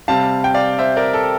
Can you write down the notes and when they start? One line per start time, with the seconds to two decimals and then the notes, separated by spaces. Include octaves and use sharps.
0.08 C3 G3 C4 F5 A5
0.44 G5
0.54 D5 F5
0.79 C5 E5
0.96 A#4 D5
1.14 A4